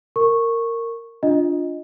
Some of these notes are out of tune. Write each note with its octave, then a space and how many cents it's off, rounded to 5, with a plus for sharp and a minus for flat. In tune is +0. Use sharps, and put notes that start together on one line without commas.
A#4 -15 C#6 -10
D4 +0 F4 +0 D#5 +0